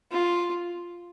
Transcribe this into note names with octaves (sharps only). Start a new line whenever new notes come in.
F4